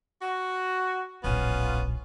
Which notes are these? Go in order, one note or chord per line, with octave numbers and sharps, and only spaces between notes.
F#4
D1 A#1 B3 C#4 F4